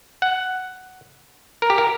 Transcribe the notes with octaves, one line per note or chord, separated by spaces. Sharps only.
F#5
A#4
G4
A#4